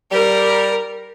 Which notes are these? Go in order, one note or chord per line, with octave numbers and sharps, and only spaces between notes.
G3 A#4